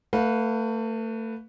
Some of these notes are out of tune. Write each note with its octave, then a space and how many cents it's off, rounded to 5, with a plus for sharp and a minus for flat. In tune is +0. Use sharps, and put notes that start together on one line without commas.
A3 +30 B4 +0 F5 +35